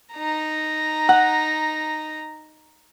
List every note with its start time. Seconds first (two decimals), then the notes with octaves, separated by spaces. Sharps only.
0.13 D#4 A#5
1.09 F#5